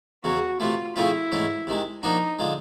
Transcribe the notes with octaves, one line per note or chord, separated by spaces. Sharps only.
E2 C#3 F#3 F#4
C3 E3 A3 F4
C#3 F3 A3 C4 E4 F4
G#2 E3 A3 C#4
C3 D#3 G#3
F3 A#3 D4 D#4 F#4
D3 F3 G#3